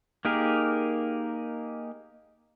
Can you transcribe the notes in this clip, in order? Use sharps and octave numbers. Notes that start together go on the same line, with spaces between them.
A#3 D#4 G4 G#4 A#4